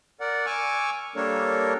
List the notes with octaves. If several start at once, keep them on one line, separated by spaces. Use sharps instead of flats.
A#4 D5 F#5
G#5 C#6 D6 E6 F6
G3 A#3 D4 A4 A#4 C#5